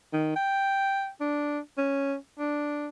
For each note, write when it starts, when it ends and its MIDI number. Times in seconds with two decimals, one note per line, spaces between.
0.13 0.35 51
0.36 1.09 79
1.20 1.59 62
1.78 2.15 61
2.39 2.87 62